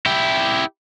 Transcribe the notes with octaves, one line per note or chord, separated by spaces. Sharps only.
E4 G4